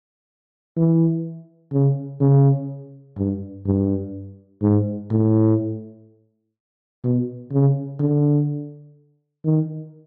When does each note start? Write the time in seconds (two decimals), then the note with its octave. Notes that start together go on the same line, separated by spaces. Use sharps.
0.77 E3
1.73 C#3
2.21 C#3
3.18 G2
3.66 G2
4.62 G#2
5.11 A2
7.04 B2
7.52 C#3
8.00 D3
9.45 D#3